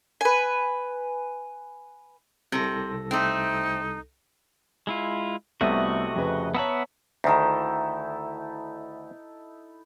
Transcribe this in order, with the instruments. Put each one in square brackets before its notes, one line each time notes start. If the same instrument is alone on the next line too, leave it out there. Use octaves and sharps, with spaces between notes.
[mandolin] B4 G#5
[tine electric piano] C2 A4 A#6 [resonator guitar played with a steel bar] C3
[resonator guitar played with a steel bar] A3 C4 [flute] D#4
[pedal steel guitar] G#3 E4 F4
[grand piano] C2 B3 [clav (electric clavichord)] C3 A3 [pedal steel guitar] F#4 D#5
[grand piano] F2 C#3 B4
[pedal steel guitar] B3 E5 F#5 [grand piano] C#5 A5 A#5
[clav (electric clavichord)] D2 D#3 [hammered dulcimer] D#4 E4 A4